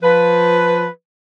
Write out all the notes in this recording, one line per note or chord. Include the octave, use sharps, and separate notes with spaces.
F3 B4